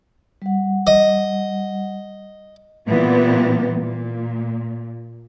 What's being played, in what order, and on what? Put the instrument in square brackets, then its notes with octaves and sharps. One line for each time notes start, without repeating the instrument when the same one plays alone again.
[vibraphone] G3 F#5
[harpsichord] D#5
[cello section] A#2 E3 G3 B3 C4
A#2